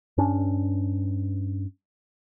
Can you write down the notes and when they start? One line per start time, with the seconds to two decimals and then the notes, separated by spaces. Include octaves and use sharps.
0.18 G2 C#4 D4